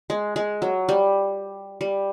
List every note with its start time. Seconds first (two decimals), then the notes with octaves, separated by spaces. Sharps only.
0.10 G#3
0.36 G#3
0.62 F#3
0.89 G3
1.81 G3